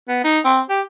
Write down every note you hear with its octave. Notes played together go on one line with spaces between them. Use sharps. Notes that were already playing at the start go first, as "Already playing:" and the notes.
B3
D#4
C4
G4